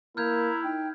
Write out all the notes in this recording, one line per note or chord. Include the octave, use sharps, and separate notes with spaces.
A#3 E4 A#5 F6 G6 G#6
D#4 G5